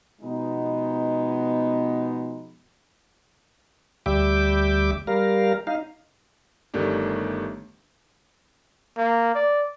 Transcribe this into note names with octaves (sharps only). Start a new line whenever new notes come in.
B2 F3 G#3 B3 D#4
D2 G3 E5 G5 D6
G3 A#4 F5
D#4 F5
G1 D#3 A3 D4 G4
A#3
D5